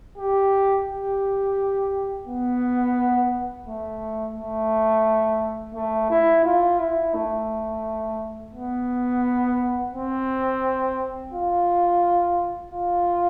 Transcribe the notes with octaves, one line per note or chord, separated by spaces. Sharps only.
G4
G4
B3
A3
A3
A3
E4
F4
E4
A3
B3
C4
F4
F4